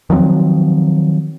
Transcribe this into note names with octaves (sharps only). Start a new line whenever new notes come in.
D#3 F3 F#3 C4